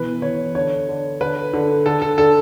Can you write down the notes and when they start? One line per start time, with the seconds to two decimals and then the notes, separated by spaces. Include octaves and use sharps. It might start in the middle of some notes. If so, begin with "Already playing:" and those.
Already playing: B2 E3 B4
0.22 E3 C#5
0.55 D3 C#5
0.88 D3
1.20 D3 B4
1.53 D3
1.86 D3 A4
2.02 A4
2.18 D3 A4